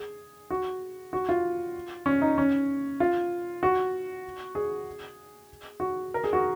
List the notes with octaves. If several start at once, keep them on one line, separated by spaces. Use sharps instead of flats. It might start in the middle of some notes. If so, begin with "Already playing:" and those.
Already playing: G#4
F#4
F#4
F4
C#4
D#4
C#4
F4
F#4
G#4
F#4
A#4
G#4
F#4